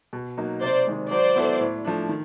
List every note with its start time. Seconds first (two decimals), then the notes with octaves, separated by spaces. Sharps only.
0.13 B2
0.37 F#3 A#3 D#4
0.62 C3 C5 D5
0.87 D#3 G#3
1.11 F#3 C5 D5
1.36 B3 E4 A4
1.60 A2
1.85 F3 A3 D4
2.09 D#3